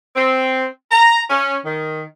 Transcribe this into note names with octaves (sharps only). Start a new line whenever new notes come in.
C4
A#5
C#4
D#3